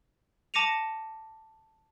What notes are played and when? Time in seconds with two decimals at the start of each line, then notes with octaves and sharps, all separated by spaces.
0.54 A5 D6 A#6 C#7 D#7 F7